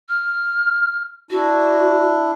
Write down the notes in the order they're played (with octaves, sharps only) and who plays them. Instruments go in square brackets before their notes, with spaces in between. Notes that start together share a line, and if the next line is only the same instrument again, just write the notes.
[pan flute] F6
[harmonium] D4 E4 [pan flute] F#4